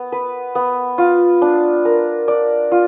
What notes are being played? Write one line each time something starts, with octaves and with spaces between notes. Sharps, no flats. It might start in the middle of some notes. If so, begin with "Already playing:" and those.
Already playing: B3
B4
B3
F4
D4
A#4
D5
F4